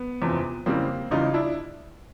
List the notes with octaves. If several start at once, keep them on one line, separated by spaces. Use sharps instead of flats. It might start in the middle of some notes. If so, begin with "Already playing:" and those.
Already playing: B3
F#1 E2 C3 F3
F2 C#3 E3 G3 A#3 C4
C#2 C#3 E3 G3 D#4 F4
D4 E4